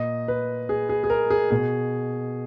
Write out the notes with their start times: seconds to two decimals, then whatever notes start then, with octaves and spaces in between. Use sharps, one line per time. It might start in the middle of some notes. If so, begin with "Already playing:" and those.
Already playing: A#2 D#5
0.28 B4
0.69 G#4
0.89 G#4
1.04 G#4
1.10 A#4
1.30 G#4
1.51 B2 G#4